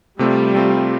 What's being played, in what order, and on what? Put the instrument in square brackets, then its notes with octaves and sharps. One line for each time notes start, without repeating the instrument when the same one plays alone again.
[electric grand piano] C3 A3 C4 F4 [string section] G3
[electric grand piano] C3 A3 C4 F4